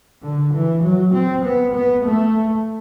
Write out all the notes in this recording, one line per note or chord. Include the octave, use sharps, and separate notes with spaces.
D3
E3
F#3
C4
B3
B3
A3